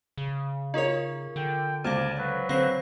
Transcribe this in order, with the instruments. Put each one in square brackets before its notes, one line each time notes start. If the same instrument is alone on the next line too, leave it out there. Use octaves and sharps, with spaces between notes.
[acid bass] C#3
[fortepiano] D#4 C#5 [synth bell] F4 G#4 A#4
[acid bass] D3 [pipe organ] G5
[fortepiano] C#2 D6 [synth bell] C5 F5 [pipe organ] D5 G#5 A5
[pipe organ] F#3 B4
[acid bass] D3 [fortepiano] C4 [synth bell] F5 C7